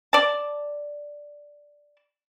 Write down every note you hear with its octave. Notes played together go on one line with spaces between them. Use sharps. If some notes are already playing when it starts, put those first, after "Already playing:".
D5 A5